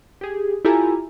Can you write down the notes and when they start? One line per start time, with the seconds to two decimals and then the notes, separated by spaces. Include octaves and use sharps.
0.21 G4 G#4
0.65 E4 F4 G4 A4 G#5 A#5